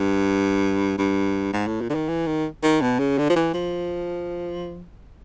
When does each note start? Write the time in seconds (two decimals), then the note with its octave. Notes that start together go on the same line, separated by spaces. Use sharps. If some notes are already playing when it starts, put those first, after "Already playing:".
Already playing: G2
0.98 G2
1.53 G#2
1.67 A2
1.81 A#2
1.90 D3
1.95 D#3
2.08 E3
2.27 D#3
2.63 D#3
2.81 B2
2.99 C#3
3.18 D3
3.29 F3
3.36 E3
3.54 F3